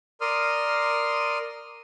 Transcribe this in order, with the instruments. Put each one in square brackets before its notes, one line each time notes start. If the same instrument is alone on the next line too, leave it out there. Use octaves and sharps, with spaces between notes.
[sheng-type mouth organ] A#4 D5 C6 D#6 F6